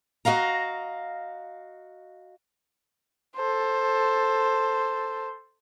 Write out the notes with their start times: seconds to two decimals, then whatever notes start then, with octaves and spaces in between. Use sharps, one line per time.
0.25 F#4 D#5 F5 A#5
3.37 A4 C5